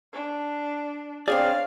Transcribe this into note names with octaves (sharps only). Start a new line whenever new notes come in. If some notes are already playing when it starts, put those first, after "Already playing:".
D4
C4 D4 G#4 C#5 D5 F5